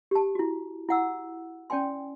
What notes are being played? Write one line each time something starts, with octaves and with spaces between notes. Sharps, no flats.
G4 A5
E4 F#4
E4 F#5 E6
C#4 D5 G5 G#5 C6